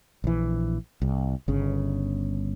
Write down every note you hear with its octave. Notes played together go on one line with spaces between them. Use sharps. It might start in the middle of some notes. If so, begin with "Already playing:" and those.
A#1 E3
C2
G1 C#3